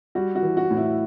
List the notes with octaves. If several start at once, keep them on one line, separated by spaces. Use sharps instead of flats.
G3 F#4
F#4
E3
F#4
A2
E4